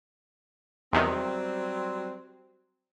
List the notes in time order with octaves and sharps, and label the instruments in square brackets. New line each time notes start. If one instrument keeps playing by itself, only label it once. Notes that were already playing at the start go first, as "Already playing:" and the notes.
[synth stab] E2 C3 D#3 [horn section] F#3 G3 C4